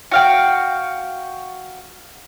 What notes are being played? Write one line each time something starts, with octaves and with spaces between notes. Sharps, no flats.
F#4 F5 G5